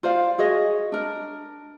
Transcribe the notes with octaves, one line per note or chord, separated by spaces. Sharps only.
F4 C5 D5 F5
F#4 G#4 C#5 D#5
D4 A#4